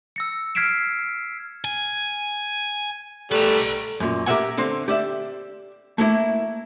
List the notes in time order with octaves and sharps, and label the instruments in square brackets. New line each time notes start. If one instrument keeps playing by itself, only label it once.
[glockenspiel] E6 A#6 C#7
F6 G#6 B6 C7 D7 E7
[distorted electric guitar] G#5
[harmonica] G3 A3 [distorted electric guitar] B4 A#5
[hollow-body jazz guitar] F#2 A#2
G4 A#4 C#5 E5 F#5 G#5
D3 C4 C5
G4 D5 E5
A3 A#3 E4